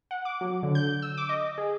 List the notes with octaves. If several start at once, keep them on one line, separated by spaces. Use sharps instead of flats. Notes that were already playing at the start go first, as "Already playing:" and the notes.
F#5
D6
F#3
D3
G6
E6
D6
D#5
G#4